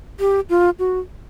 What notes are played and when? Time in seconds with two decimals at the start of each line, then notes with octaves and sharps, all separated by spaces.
0.20 G4
0.50 F4
0.79 F#4